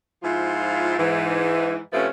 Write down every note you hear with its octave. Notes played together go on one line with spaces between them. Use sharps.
G#2 F3 E4 F4
G#2 E3
C3 F3 A3 C#4 B4